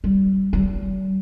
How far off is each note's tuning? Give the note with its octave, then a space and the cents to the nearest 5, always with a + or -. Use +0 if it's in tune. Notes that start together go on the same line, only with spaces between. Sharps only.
G3 -25
G3 -45